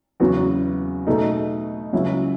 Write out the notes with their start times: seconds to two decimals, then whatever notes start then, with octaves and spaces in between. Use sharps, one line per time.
0.20 E2 C#3 F#3 B3 F#4
1.07 B2 A3 D#4
1.92 C#2 C#3 F#3 C#4 E4